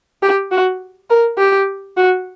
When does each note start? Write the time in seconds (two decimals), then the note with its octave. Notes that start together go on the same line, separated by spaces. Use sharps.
0.23 G4
0.51 F#4
1.10 A#4
1.38 G4
1.97 F#4